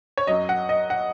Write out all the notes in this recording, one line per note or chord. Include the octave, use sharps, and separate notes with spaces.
C#5
F#2 F#3 D#5
F#5
D#5
F#5